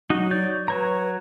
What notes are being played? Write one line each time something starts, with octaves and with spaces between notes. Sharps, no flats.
F#3 D#4 F#4
C#5 D5 G6
F#3 B4 C#5 A#5